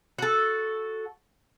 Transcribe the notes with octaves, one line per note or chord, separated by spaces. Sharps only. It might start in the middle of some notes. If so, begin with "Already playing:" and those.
F#4 A4